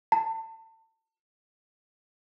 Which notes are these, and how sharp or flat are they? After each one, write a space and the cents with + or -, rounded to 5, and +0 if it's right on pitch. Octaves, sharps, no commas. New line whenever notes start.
A5 +30